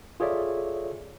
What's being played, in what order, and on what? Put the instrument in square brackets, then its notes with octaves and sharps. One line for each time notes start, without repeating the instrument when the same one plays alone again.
[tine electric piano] F4 G#4 A4 C#5 D5 E5